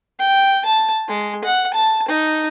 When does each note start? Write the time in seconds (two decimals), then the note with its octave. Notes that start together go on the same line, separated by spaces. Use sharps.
0.19 G5
0.65 A5
1.08 G#3
1.44 F#5
1.73 A5
2.08 D#4